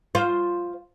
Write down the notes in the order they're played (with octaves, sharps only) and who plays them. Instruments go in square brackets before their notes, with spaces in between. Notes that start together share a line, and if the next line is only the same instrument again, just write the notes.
[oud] F4 C5